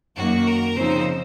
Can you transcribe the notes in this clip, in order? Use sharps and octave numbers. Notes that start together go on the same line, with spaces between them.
F#2 D#3 A#3 F#4
A#4
C#3 F3 C4 D#4 C5